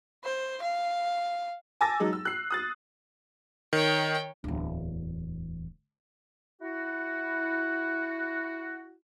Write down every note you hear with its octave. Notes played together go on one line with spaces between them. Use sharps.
C5
F5
G#5 A5 D6 E6 A6 A#6
F#3 G#3 D#4
E6
F#6 C7
D#6 F#6 A6
D#3 C#5 G5
D1 E2
E4 F#4